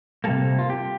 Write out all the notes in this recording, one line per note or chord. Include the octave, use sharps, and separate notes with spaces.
C3 G3 A#3 A4
F4
G4